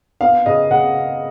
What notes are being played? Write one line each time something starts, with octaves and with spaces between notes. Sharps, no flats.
B3 F5
C#3 D#5
C#3 F#5